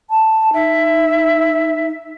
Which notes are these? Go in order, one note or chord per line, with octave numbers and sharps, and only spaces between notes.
A5
D#4 E5